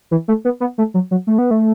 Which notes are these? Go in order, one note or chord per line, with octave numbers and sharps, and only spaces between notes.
E3
A3
B3
B3
A3
F#3
F#3
A3
B3
A3